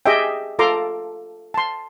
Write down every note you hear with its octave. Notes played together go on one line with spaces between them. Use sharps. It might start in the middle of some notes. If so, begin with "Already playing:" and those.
G4 G#4 D#5 E5 G5
F4 A4 A#5 C6 D6
A5 C6